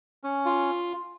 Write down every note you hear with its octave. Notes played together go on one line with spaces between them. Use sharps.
C#4
F4